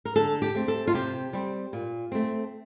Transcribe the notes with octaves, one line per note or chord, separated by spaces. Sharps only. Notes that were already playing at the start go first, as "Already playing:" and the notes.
A#4
D3 A4
G4
A3 C4
A4
F4
C3 G4
G3 C4
A#2
A3 C4